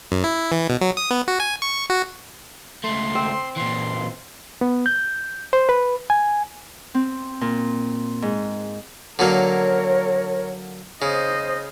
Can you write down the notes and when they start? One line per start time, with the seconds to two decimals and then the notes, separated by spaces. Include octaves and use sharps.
0.12 F#2
0.24 E4
0.52 E3
0.70 B2
0.81 F#3
0.97 D#6
1.11 B3
1.28 F#4
1.40 G#5
1.62 C#6
1.90 F#4
2.84 C#2 A3 C6
3.15 C4
3.56 A#2 E3 C6
4.61 B3
4.86 G6
5.53 C5
5.69 B4
6.10 G#5
6.95 C4
7.41 A#2
8.22 G#2
9.19 D3 F#3 A#3 A#4 C#5
11.02 C#3 C5 D#5